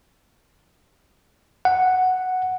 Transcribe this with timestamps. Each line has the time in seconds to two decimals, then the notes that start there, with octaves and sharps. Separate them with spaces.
1.65 F#5